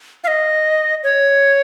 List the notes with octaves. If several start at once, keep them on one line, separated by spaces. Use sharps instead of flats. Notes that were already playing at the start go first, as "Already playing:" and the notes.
F5
D#5
C#5